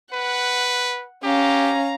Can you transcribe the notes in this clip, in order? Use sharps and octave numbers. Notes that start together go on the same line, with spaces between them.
B4 F#5
C#4 G4 F5 A#5